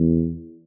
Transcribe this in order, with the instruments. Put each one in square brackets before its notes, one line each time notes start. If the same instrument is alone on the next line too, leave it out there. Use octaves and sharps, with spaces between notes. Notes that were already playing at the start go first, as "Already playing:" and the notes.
Already playing: [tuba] E2